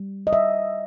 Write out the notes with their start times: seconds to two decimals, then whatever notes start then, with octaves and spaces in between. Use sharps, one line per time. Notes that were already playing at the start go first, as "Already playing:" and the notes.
Already playing: G3
0.27 D#5
0.33 G3 E5